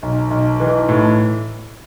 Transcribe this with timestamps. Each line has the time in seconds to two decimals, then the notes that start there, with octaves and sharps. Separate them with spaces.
0.03 B1
0.31 B1
0.60 E3
0.89 A2